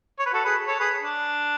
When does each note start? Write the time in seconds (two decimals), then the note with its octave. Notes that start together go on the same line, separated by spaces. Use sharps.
0.19 C#5
0.26 B4
0.33 F#4 A4
0.45 G#4 B4
0.67 A4 C#5
0.80 G#4 B4
1.02 D4